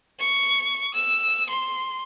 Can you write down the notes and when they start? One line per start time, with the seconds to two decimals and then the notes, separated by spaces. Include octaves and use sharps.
0.19 C#6
0.94 E6
1.49 C6